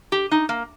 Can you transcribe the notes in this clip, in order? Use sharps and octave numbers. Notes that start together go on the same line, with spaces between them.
G4
D#4
A#3